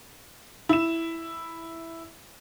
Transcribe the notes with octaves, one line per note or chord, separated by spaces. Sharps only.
E4 E7